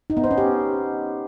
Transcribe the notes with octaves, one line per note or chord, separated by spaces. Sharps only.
D#4
B3
C5
C#4
G4